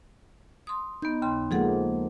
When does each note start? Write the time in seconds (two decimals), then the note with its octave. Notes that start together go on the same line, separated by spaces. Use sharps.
0.67 C6 D#6
1.02 B3 D#4 G6
1.22 D#2 C#3 C6
1.51 F3 G#3 A#3 G#4 A4 F#5